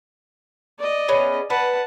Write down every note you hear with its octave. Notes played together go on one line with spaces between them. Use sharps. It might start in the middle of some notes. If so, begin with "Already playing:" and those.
D5 D#5
B3 C#4 G#4
B4 F#5 A5